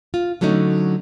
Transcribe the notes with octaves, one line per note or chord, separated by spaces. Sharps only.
F4
D3 F#3 A3 C#4 D#4